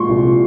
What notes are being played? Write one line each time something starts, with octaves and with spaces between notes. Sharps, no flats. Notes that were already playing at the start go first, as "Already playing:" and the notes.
Already playing: A#2 F3 G#3 C6 C#6
C2